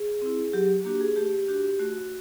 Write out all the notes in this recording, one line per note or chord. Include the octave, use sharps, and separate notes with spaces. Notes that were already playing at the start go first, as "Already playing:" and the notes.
Already playing: G#4
C4 E4
F#3 G4
A#3 D4 F#4 G4
G#4
A3 G4
D4 F#4 G4
A3 F#4